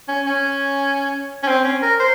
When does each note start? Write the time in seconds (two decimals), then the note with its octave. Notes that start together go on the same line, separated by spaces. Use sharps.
0.08 C#4
0.26 C#4
1.43 C#4
1.48 C4
1.64 C#4
1.82 A#4
1.99 C5